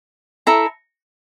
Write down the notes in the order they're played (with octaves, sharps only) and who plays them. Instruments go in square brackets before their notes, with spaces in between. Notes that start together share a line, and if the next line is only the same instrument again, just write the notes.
[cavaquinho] E4 A4 E5 A#5